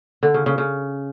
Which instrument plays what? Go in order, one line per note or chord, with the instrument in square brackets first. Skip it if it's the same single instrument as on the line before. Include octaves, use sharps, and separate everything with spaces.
[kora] D3
C#3
C#3
C#3